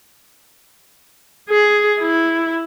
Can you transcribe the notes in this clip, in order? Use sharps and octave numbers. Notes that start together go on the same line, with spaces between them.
G#4
E4